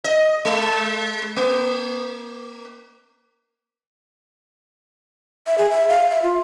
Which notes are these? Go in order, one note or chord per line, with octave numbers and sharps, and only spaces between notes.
D#5
G#3
A#3
E5
G#4
E5
F5
E5
F4